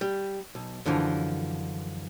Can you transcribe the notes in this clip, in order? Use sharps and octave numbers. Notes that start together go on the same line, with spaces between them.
G3
B1
F#2 D3 E3 F3